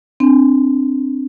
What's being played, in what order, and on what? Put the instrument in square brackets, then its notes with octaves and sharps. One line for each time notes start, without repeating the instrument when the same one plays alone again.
[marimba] C4 D4